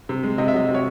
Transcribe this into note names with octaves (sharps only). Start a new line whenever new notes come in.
C3
G#3
C3 D#5
E5
F#3 D#5
C3
C#5